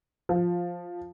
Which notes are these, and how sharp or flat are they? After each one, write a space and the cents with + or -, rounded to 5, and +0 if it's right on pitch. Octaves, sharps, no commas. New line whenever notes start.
F3 +5